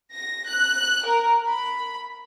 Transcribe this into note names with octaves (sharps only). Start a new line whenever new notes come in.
A#6
F#6
A#4
B5